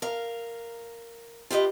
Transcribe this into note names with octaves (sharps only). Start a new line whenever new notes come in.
A#4 F5
F4 G4 B4 D#5